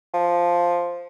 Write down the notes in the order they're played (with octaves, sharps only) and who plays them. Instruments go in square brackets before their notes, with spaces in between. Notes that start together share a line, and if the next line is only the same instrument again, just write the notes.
[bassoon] F3